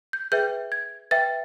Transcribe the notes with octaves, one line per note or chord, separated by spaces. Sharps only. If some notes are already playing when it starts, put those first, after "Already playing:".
G6
G#4 B4 E5 G5 G6
G#6
B4 E5 G5 A6